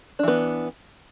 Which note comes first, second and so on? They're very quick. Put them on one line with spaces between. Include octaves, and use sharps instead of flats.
D4 E3 B3